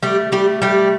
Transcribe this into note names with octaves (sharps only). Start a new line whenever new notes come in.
G3 A3 G4
G3 A3 G4
G3 A3 G4